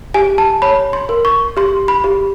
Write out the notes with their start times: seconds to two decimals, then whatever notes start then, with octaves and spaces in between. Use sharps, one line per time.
0.14 G4 G#5
0.38 A5
0.62 C#5 B5
0.93 C6
1.09 A#4
1.25 C#6
1.57 G4 C6
1.88 B5
2.04 G4